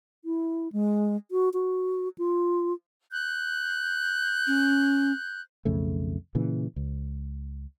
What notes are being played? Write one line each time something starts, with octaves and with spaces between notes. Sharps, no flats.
E4
G#3
F#4
F#4
F4
F#6 G6
C#4
B1 F2 C#3 A3
A#2 C#3 E3
C#2